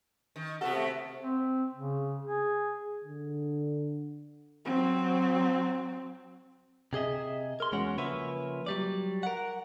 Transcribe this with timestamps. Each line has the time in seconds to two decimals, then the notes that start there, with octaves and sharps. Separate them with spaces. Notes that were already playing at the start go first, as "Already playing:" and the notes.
0.36 D#3
0.61 C3 B3 F#4 A4
0.75 A3
1.21 C4
1.75 C#3
2.25 G#4
3.04 D3
4.66 F#3 C4
6.93 C3 G#4 D#5 E5
7.60 A#4 C6
7.72 E2 G#3 C#4 F#4 C#5 F#5
7.98 C#3 F3 A#3 B4 C#5 E5
8.66 F#3 G3 D5
9.23 A#4 F#5